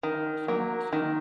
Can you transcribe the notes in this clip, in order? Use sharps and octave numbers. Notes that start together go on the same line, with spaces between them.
D#3
F#3 A#3
D#3